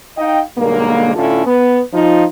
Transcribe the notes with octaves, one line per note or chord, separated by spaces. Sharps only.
D#4 D#5 F5 G5
B1 G2 D3 G#3 A#3
A2 D3 C#4 E4 F4 A4
B3
F3 D#4 F4